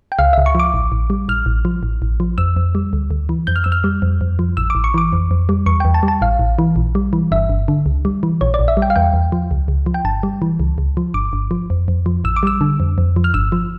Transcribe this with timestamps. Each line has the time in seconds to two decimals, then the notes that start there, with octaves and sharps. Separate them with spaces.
0.12 G5
0.19 C#2 F5
0.33 C#2 E5
0.46 C#6
0.55 F3 D6
0.74 A1
0.92 A1
1.10 G3
1.28 A1 F6
1.46 A1
1.65 F3
1.83 A1
2.02 A1
2.20 F3
2.38 F2 E6
2.56 F2
2.75 G3
2.93 D2
3.11 D2
3.29 E3
3.47 F2 G6
3.56 F6
3.64 F2 E6
3.72 F6
3.84 G3
4.02 F2
4.21 F2
4.39 F3
4.57 A1 E6
4.70 A1 D6
4.84 C#6
4.94 E3 D6
5.13 F2
5.31 F2
5.49 G3
5.66 E2 C#6
5.80 E2 G5
5.94 A5
6.03 G3
6.08 A5
6.22 A1 F5
6.39 A1
6.59 E3
6.76 A#1
6.95 G3
7.13 E3
7.32 G1 E5
7.50 G1
7.68 D3
7.86 C#2
8.05 G3
8.23 E3
8.41 A#1 C#5
8.54 D5
8.59 A#1
8.68 E5
8.77 G3
8.82 G5
8.90 F5
8.96 E2 G5
9.14 E2
9.32 F3
9.51 C#2
9.68 C#2
9.86 F3
9.94 G5
10.05 G1 A5
10.23 G3
10.42 E3
10.60 C#2
10.78 C#2
10.97 F3
11.14 G1 D6
11.33 G1
11.51 F3
11.70 F2
11.88 F2
12.06 F3
12.24 A1 E6
12.36 D6
12.43 G3 E6
12.61 D3
12.80 F2
12.98 F2
13.16 F3
13.24 F6
13.34 G1 E6
13.52 F3